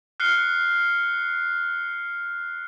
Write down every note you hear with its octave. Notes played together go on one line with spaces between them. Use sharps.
F6 F#6 C7 C#7 G7